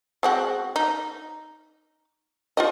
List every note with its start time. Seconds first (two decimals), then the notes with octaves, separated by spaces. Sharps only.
0.23 G#3 C4 F#4
0.76 D#4
2.57 F4 G4 D#5